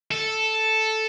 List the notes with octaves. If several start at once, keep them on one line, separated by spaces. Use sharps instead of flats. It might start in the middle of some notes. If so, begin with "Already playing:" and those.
A4